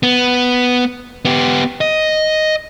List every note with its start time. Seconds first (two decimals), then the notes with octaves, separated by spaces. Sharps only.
0.03 B3
1.25 B3 G4
1.81 D#5